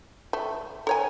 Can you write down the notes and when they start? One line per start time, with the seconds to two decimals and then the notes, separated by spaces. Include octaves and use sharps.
0.33 A3
0.87 A4 C#5 G#5 A#5